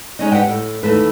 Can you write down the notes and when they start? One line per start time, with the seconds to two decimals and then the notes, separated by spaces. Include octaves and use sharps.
0.19 G#3 C#4 D#4
0.31 G4 B4 D#5 F#5 G5
0.47 A2
0.83 D#2 A2 E3 A3 B4